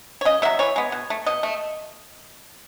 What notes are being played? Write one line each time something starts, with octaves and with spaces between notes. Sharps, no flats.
C#5
C#3 D#5
F#3 A3 E5
E3 C#5
G#3 B3
B2
A3
B2 D#5
A3